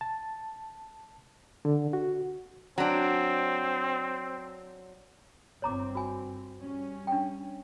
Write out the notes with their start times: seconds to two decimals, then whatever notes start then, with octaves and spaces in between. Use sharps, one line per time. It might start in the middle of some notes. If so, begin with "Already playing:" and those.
0.01 A5
1.65 D3
1.93 F#4
2.78 F#3 C4 D4
5.62 G1 C4 C#5 A#5 D6
5.95 F#4 G#5
6.59 G3 C#4
7.07 D4 G5